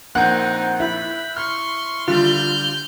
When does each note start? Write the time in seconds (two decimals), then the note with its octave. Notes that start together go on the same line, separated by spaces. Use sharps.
0.15 A#1 A#3 C4 D#4 F#5 F#6 G6
0.80 E4 B5
1.37 C6 C#6 F6
2.08 D3 G3 F4 F6 G6